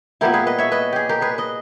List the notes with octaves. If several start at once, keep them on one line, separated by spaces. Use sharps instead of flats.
A#2 G3 B3 E4 G4 A#4
G#4 B4
B4 D#5
C#5 E5
B4 D#5
G4 G#4
G4 A#4
G#4 B4
B4 D#5